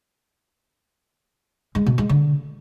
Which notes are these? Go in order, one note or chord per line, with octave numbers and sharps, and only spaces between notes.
G#3
B2
G#3
D3